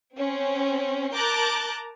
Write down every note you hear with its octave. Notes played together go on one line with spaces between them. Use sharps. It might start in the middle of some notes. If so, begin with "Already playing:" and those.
C4 C#4
A#4 A5 A#5 D6 F#6 G6